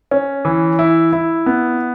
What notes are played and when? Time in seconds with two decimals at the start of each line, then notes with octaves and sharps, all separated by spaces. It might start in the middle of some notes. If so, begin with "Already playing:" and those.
0.11 C#4
0.45 E3
0.79 E4
1.13 E4
1.46 B3